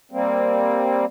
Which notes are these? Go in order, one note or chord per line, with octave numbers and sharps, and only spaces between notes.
G3 A#3 C4